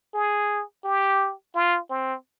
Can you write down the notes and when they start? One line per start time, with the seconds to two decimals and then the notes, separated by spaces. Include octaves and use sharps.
0.14 G#4
0.84 G4
1.55 F4
1.90 C4